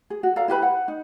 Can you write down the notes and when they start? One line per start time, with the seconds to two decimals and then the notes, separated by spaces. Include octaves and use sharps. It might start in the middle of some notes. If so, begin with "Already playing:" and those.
0.10 G#4
0.23 F#4
0.36 A4 D5 F5 A#5
0.48 E4 G4 B4 B5
0.62 F#5
0.88 D#4